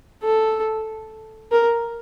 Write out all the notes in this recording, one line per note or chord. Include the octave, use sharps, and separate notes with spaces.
A4
A#4